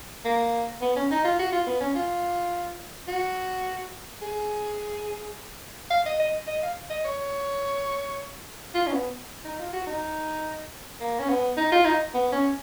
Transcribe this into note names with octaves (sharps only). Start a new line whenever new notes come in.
A#3
B3
C#4
D#4
F4
F#4
F4
B3
C#4
F4
F#4
G#4
F5
D#5
D#5
D#5
F5
D#5
C#5
F4
C#4
B3
D#4
F4
F#4
D#4
A#3
C#4
B3
D#4
F4
D#4
B3
C#4